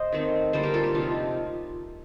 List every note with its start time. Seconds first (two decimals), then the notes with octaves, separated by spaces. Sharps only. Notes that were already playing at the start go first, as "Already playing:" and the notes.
Already playing: C5 D#5
0.13 D#3 A3 C4
0.53 D3 G3 A#3 A4 C5
0.63 G4 A#4
0.74 F4 A4
0.84 G4
0.94 C3 F3 A3 D#4 F4